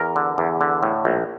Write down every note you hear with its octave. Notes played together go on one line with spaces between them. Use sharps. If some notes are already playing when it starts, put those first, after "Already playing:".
Already playing: E2 A#4
D3
E2
D3
A2
A#1